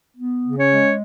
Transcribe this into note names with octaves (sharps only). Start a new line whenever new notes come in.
B3
C#3
C#4 C#5
G#3